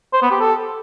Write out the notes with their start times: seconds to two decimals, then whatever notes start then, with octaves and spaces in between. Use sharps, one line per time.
0.13 C5
0.22 B3
0.31 G4
0.40 A4